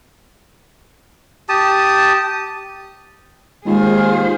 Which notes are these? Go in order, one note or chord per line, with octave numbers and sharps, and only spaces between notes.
G4 A5 D#6
D#2 G#3 F4 G#4 C5